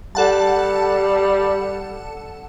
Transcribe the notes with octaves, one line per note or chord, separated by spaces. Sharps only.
G3 A4 F#5 A5